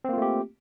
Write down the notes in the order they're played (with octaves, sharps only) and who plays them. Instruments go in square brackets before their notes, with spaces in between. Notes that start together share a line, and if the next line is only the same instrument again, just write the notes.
[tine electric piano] C4
A#3
F4
A3
G4